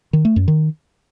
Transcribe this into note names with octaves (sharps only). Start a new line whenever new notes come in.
D#3
A3
F#2
D#3